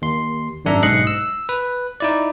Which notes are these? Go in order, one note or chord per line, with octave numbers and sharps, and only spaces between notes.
D#2 C6
G#1 F#2 D4 E5 A#5
B1 G#2 D#5 F#6 C7 C#7
E6
B4
D#4 E4 D5